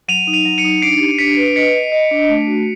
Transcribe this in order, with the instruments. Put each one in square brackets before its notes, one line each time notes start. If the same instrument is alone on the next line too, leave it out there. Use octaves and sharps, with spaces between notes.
[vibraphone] F#3 [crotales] D#7 F7
[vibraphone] D#4
[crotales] D#7 F7
[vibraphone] F#3
[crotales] C#7 D#7
[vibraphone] D#4
[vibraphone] D4 [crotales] C7 D7
[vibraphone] G4
[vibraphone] D4 [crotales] B6 C#7
[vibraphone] B4
[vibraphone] D#5 [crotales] B6 C#7
[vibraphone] D#5
D#5
D4
A3
F#4